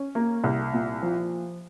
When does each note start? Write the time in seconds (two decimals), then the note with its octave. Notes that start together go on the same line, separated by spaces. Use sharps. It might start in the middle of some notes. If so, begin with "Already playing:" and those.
Already playing: C#4
0.15 A#3
0.44 C2
0.74 A#2
1.02 F3